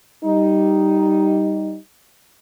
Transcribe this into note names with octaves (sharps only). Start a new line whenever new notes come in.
G3 D#4